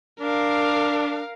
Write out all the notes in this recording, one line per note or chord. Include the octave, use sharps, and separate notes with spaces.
D4 A#4 F5